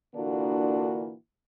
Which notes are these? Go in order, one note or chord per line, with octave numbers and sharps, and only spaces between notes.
A#2 D3 E3 A#3 D4 F#4